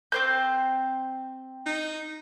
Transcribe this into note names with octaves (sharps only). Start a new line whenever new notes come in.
C4 C5 G6
D#4